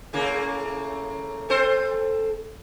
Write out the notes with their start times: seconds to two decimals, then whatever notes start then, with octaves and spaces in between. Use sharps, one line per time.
0.13 A2 C#3 A#3
1.50 C4 A4 C5